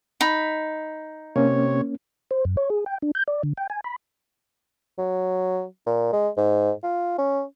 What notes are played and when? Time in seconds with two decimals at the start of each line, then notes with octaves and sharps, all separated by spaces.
0.21 D#4 B5
1.36 C3 A#3 C#4 C#5
2.31 C5
2.45 F#2
2.57 C#5
2.70 G#4
2.86 G5
3.02 D4
3.15 G6
3.28 D5
3.43 D3
3.57 G5
3.70 G#5
3.84 B5
4.98 F#3
5.87 A#2
6.13 G#3
6.37 G#2
6.83 F4
7.19 C#4